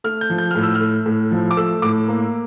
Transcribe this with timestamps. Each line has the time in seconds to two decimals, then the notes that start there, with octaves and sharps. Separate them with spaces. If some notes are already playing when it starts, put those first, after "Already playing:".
0.04 A3 F6
0.21 G6
0.30 F3
0.38 G6
0.51 A2 F6
0.62 E6
0.75 F6
0.81 A3
1.06 A2
1.31 F3
1.51 D6
1.57 A3 E6
1.82 A2 D6
2.08 A#3